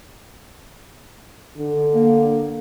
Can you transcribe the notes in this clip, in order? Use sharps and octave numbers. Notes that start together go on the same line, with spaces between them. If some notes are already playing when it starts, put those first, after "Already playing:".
D3
A#3